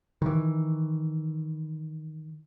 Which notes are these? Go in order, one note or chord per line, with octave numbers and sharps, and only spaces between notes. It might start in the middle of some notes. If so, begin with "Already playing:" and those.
D#3 E3